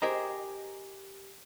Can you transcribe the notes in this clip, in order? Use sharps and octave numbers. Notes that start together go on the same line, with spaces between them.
G4 G#4 A#4 C5 D#5 A#5